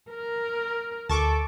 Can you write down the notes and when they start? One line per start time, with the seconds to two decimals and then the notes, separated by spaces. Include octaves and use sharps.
0.11 A#4
1.09 D2 A4 A5 C#6 D6